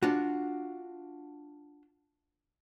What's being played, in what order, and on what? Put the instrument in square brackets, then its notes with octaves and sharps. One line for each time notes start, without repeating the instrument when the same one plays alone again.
[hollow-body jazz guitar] D4 F4 F#4